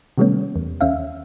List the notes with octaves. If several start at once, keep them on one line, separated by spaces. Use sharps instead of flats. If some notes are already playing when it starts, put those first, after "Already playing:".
C3 D#3 G3 A3 B3 C#4
E2
D#2 C#4 E5 F5